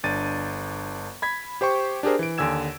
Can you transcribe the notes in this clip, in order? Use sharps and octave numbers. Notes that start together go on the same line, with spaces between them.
G1 D4 A6 D#7
B5 G#6 B6
G4 C5 G5 C#6
D4 G4 G#4 A#4 C5
E3 D7
D#2 D3 G#5 E6 G#6 E7